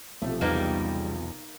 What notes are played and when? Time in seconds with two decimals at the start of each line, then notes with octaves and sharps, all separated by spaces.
0.22 B1 C3 F3 A3
0.41 E2 C#3 G3 A#3 B3 D#4